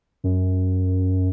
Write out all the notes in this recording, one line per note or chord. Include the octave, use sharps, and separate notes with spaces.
F#2